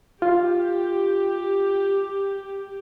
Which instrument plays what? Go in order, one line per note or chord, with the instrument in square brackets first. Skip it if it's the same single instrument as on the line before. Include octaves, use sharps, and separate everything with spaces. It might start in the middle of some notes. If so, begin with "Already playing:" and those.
[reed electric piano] F4 [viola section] G4